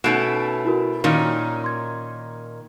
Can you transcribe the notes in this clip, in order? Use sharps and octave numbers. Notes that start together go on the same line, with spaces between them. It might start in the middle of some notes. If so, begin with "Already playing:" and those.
B2 A3 C#4 D#4 D7 E7
E4 F#4 A#4
A#2 D#3 C#4
C6 G#6